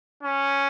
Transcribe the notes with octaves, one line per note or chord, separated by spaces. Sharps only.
C#4